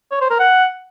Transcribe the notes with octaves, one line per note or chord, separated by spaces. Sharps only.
C#5
C5
A#4
F#5